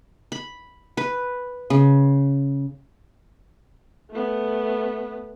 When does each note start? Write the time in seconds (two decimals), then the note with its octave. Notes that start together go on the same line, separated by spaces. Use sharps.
0.32 B5
0.97 B4
1.70 C#3
4.11 A3 B3